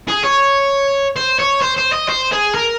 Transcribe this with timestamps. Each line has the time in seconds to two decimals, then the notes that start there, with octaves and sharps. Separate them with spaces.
0.08 G#4
0.23 C#5
1.16 C5
1.39 C#5
1.62 C5
1.78 C5
1.93 D#5
2.09 C5
2.32 G#4
2.54 A#4